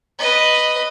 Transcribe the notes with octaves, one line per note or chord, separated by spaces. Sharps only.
B4 D#5